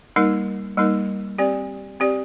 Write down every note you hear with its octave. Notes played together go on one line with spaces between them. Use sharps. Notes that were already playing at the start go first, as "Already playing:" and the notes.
G3 A#3 D#4 A#4
G3 A#3 D#4 A#4
C4 G4 D5
C4 G4 D5